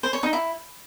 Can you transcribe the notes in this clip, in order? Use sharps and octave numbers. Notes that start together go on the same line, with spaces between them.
C5
C#5
D#4
E4